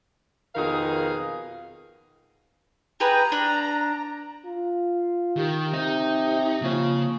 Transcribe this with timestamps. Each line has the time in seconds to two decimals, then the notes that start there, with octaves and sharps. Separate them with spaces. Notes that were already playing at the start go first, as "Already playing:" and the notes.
0.55 F2 B2 D#3 G#4 A#4 F5
3.00 G4 G#4 B4 A#5
3.32 D4
4.46 F4
5.37 D#3 G4
5.74 C3 D#4
6.62 C#3 F3 A#3 C#5